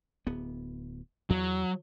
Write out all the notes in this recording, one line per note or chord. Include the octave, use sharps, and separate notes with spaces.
D1 B3
E2 F#3